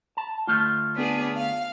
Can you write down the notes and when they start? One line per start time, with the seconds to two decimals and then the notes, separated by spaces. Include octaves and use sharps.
0.17 A5
0.47 D2 A3 F4
0.95 B3 D4 G#4
1.36 F5